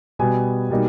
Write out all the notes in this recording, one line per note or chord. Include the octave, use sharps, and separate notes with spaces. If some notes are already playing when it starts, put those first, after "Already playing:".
B2 G3 B3 G#5
B2 G3 A#3 D#4